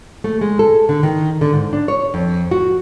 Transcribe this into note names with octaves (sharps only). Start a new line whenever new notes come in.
A3
G#3
A4
D3
D#3
D3
G#2
D4
C#5
F2
F#4